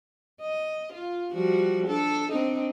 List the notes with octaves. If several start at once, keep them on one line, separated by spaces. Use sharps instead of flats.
D#5
F4
F3 G3 F#4
D4 A4
C4 D4 D#4